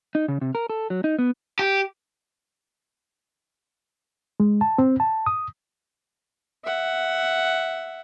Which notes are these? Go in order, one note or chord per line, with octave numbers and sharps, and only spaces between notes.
D#4
C#3
C3
A#4
A4
F#3
D#4
B3
G4
G#3
A5
C4
A5
D#6
E5 F#5